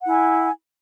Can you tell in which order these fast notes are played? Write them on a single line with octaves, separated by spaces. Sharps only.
F#5 E4 G#5